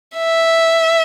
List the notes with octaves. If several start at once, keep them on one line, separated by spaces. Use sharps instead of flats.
E5